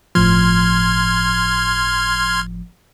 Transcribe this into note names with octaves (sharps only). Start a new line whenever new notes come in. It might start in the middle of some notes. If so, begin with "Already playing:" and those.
G1 A2 F3 C6 F6 G#6